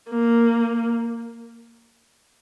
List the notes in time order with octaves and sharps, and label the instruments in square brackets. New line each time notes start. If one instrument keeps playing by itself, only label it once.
[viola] A#3